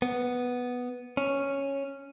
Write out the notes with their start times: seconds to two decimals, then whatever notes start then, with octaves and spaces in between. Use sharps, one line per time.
0.02 B3
1.17 C#4